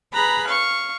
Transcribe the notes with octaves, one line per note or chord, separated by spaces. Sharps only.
G#4 B4 A#5 B5 F#6
F5 C#6